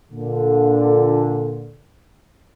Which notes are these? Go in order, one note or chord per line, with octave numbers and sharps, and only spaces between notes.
A#2 D3